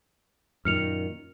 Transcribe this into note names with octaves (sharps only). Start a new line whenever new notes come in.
F#2 A#2 D#3 F6 C#7 F7